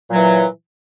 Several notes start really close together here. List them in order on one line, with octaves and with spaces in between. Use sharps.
A#2 F#3 E3